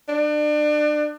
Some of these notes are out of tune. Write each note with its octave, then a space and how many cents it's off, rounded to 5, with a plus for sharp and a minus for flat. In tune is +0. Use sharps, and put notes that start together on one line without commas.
D4 +30